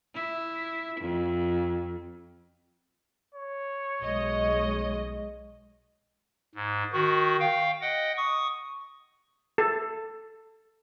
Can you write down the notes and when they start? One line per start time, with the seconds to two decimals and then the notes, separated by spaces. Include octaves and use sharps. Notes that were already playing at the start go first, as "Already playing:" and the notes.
0.15 E4
1.00 F2
3.35 C#5
4.02 B1 G#3 D#5
6.55 G#2
6.93 D#3 F#4
7.40 F5 G5
7.81 D#5 F#5 G5
8.17 C#6 D#6
9.58 A4